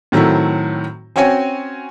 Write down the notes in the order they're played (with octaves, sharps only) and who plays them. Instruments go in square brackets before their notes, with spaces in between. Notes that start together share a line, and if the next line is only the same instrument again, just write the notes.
[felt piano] A2 D#3 F#3 A3 C4 E4
C4 C#4 F#4 C#5 G5 G#5